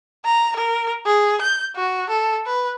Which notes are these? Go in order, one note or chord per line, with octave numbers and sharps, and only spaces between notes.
A#5
A#4
G#4
G6
F#4
A4
B4